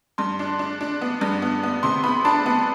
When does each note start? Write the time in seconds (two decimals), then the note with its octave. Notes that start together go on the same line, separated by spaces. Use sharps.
0.18 G2 C6
0.39 D4
0.59 D4
0.81 D4
1.01 B3
1.21 G2
1.42 B3
1.63 B3
1.83 C3 C6
2.04 B3 B5
2.25 D4 A5
2.46 B3